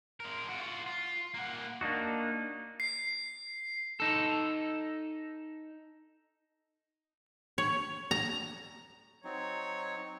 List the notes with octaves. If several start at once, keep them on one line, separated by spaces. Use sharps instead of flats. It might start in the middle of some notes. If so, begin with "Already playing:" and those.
G#3 A#4
F4 F#4
F4
A#3 F#5
A#3 D4 D#4 F#4
C7
D#4 A4
C#5
A#5
F#3 C4 D#4 C#5